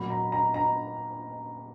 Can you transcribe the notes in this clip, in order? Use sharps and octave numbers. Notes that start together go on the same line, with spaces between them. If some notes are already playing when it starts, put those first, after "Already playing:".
Already playing: A#2 F#3 A#3 B5
A#5
A#5
A#5